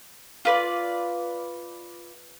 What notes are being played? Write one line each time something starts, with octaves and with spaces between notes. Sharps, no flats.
F4 B4 D5